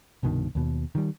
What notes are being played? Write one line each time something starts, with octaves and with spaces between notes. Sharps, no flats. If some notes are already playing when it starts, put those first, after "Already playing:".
C2 G2 B2 D#3
D#2 B2
D#3 F#3 G3